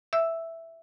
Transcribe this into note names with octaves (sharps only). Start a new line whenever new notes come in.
E5 E6